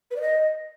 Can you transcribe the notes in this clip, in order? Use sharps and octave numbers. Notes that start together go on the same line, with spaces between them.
B4
D5
D#5